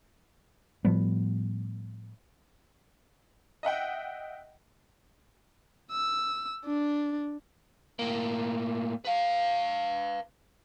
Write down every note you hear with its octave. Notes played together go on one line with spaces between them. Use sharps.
A2 F3 G3 B3
D#5 E5 F#5 G5
E6
D4
A2 A#3
B4 F5